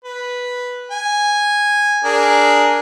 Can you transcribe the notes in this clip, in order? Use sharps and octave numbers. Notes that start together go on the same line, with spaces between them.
B4
G#5
D4 G#4 A#4